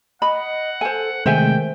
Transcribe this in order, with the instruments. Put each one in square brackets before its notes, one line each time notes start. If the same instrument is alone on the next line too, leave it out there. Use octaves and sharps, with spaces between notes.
[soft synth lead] D#5 [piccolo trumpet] F#5 [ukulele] B5
[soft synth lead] A4 [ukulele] C5 G#5
[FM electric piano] C3 G#3 A3 [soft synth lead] D#3 [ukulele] C5 E5 G#5 [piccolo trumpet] G5